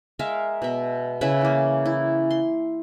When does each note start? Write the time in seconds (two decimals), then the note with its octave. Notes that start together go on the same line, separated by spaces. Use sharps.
0.19 G#3 A#4 E5 F5
0.62 B2 E5
1.21 C#3 E4 B4 E5
1.41 E3 A#3
1.86 E4
2.31 C6